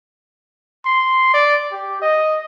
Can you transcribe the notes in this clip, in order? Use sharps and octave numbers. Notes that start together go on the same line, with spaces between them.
C6
D5
G4
D#5